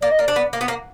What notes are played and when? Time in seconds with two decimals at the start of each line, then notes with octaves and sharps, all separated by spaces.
0.02 A#3 D5
0.11 D#5
0.19 A#3 D5
0.28 D4
0.36 B3
0.53 A#3
0.61 B3
0.68 A#3